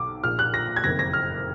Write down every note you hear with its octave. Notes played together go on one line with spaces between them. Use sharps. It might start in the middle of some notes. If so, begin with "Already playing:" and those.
Already playing: B1 D6
A#1 A#2 F6
F#6
A#6
G#6
F#1 F2 D#3 A#6
A#6
F6